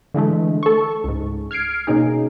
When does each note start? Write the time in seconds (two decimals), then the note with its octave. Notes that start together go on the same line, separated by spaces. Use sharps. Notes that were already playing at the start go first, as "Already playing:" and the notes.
0.14 D3 E3 G#3 A3
0.63 A4 C#6
1.04 C#2 G#2
1.51 F6 G#6 C7 D7
1.87 B2 A#3 C#4 D#4 G#4